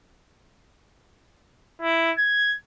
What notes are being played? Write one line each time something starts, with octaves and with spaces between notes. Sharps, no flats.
E4
G#6